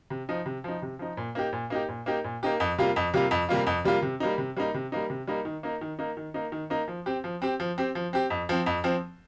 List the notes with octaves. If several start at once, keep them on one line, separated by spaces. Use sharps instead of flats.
C3
F3 D#4
C3
F3 D#4
C3
F3 D#4
A#2
A#3 D#4 G4
A#2
A#3 D#4 G4
A#2
A#3 D#4 G4
A#2
A#3 D#4 G4
F2
C3 G3 A#3 F4
F2
C3 G3 A#3 F4
F2
C3 G3 A#3 F4
F2
C3 G3 A#3 F4
C3
G3 A#3 D#4
C3
G3 A#3 D#4
C3
G3 A#3 D#4
C3
G3 A#3 D#4
D#3
A#3 D#4
D#3
A#3 D#4
D#3
A#3 D#4
D#3
A#3 D#4
F3
C4 G4
F3
C4 G4
F3
C4 G4
F3
C4 G4
F2
F3 C4
F2
F3 C4